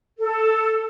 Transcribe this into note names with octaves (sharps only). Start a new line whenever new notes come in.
A4